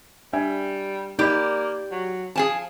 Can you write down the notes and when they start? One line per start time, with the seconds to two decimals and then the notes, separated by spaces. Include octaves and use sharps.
0.33 G3 D4 E5 G#5
1.19 A#3 D#4 G4 D5 B5
1.91 F#3
2.36 F3 G#4 G#5 A5